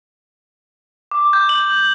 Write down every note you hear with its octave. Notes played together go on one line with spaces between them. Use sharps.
D6
G6
F#7